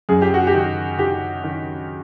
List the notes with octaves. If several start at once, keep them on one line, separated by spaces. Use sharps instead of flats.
F#2 G#4
G4
F#4
G4
D#3
D#3 G4
D#3